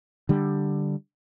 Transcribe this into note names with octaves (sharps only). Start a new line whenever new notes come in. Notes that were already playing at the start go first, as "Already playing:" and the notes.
D3 G3